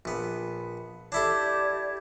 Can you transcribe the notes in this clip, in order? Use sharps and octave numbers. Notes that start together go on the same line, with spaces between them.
A#1 B3
D4 E4 G4 A4 D5 G#6